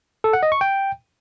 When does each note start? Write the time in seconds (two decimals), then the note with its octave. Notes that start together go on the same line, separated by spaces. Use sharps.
0.24 A4
0.33 F#5
0.43 D#5
0.52 C#6
0.61 G5